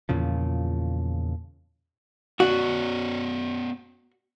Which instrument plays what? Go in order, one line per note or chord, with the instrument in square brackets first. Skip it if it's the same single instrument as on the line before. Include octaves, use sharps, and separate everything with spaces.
[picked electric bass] E2 A#2 C#3 F3
[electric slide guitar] B3 C#4 D5 [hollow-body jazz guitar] F#4